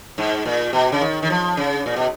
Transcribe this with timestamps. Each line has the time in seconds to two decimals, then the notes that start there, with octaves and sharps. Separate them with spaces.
0.18 G#2
0.45 A#2
0.73 B2
0.92 C#3
1.01 D#3
1.22 D#3
1.30 F3
1.57 C#3
1.86 A#2
1.96 B2